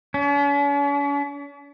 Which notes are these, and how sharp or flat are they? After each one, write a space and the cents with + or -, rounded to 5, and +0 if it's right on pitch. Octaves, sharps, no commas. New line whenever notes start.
C#4 +45